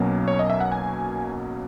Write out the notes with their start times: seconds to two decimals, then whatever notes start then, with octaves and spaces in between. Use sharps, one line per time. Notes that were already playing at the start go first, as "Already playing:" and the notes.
Already playing: B1 B2 F#3 A#3 C#4
0.28 C#5
0.39 D#5
0.50 E5
0.60 F#5
0.72 G#5